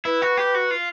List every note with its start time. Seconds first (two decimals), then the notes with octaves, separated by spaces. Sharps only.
0.05 E4 B4
0.22 F#4
0.37 G4
0.54 F#4
0.71 F4